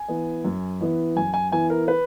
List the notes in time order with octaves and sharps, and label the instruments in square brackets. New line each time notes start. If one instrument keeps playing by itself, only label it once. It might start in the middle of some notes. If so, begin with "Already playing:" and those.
Already playing: [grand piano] G#5
E3 B3
F#2
E3 B3
F#2 G#5
G#5
E3 B3 G#5
A#4
B4